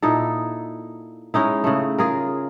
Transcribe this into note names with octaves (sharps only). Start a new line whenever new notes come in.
A#2 D#4 E4 A4
G#3 C#4 D#4 E4
C#3 A3
F4 G#4 A#4